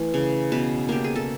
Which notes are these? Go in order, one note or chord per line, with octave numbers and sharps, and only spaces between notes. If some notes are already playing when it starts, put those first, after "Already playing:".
Already playing: E3 A3
C#3
B2 B4
A#3 G4
G#4
A4